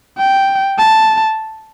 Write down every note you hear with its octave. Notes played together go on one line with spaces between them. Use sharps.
G5
A5